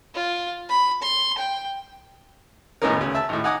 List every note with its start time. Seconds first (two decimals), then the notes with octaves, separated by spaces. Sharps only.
0.14 F4
0.69 B5
1.02 C6
1.38 G5
2.82 G#1 A2 B3 C#4 D#4 A#4
2.96 D2 C#3
3.15 E5 A5
3.29 G#1 A2
3.44 D#4 F#5 G#5 D6 D#6